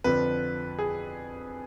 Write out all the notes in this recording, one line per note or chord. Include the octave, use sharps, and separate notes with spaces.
F2 D3 F3 B4
G#4